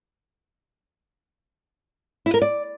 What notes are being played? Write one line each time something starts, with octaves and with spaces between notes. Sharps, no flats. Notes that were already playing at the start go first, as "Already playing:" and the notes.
E4
A#4
D5